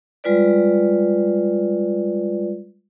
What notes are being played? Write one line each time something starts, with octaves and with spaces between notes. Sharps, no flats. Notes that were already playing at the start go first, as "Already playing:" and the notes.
G3 G#3 F4 B4 D5